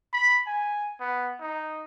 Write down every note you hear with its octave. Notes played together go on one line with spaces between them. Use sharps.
B5
G#5
B3
D#4